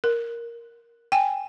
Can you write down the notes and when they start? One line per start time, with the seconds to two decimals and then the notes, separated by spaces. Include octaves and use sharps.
0.04 A#4
1.12 G5 G#5